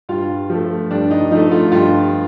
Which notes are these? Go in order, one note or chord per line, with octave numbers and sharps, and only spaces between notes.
G2 F4
F3 A3
G2 D4
D#4
F3 A3 D#4
F4
G2 F4